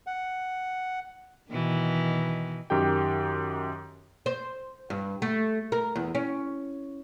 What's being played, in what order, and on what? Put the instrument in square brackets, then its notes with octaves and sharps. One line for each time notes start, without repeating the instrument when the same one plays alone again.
[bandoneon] F#5
[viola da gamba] B2 D#3 E3
[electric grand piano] F#2 D#3 G4 G5
[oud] C5
G2
A3
A#4
E2
C#4